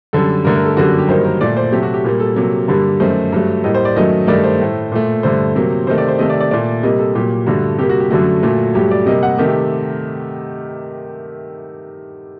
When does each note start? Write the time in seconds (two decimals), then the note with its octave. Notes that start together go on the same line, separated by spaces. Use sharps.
0.13 F#2 D3 G3 A4
0.44 G2 D3 A3 A#4
0.56 A#4
0.66 A4
0.77 F#2 D3 G3 A#3 F#4
0.88 F#4
0.98 G4
1.08 G2 D#3 F#3 A#3 C5
1.25 A#4
1.41 A#2 A3 D5
1.57 C5
1.72 C3 F#3 A3 G4
1.83 F#4
1.94 G4
2.04 A#2 G3 A#3
2.20 A4
2.36 C3 F#3 A#3
2.68 G2 D3 G3 A#3
3.00 F#2 D#3 A3 C5
3.32 G2 F#3 A3
3.64 A2 G3 A#3 D#5
3.75 C5
3.85 D5
3.96 F#2 D#3 F#3 A3 D#5
4.27 G2 D#3 A3 D5
4.44 C5
4.60 A2 A3
4.92 A#2 A3
5.23 G2 D3 A3 C5
5.56 C3 F#3 A#3
5.87 C3 D#3 A3 C5
5.98 D5
6.09 C5
6.19 C3 D#3 A3 D#5
6.30 D5
6.40 D5
6.51 A#2 A3 D5
6.83 C3 G3 A#3 D#5
6.99 A4
7.15 A#2 F#3 A#3 G4
7.47 G2 D3 A3 F#4
7.78 C3 G3 A#3 G4
7.89 F#4
8.00 G4
8.10 F#2 D3 F#3 A3 F#4
8.43 A#2 F#3 A3
8.75 G2 F#3 A3 G4
8.91 D5
9.06 C3 G3 A#3 D#5
9.23 F#5
9.38 C3 D#3 A3 G4
9.49 G4